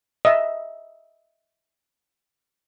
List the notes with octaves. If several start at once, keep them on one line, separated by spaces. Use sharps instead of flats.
D#5 E5